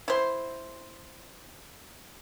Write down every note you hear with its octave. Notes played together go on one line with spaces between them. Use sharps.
E4 C5